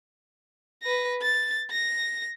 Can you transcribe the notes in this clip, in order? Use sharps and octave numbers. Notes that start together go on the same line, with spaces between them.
B4 A#6
A6
A#6